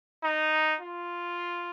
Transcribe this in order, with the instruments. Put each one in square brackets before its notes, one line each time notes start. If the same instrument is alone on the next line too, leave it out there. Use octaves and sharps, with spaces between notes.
[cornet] D#4
F4